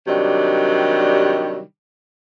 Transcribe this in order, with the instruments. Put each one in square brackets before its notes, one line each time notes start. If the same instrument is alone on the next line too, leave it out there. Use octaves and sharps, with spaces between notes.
[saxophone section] C3 D#3 F#3 G3 D4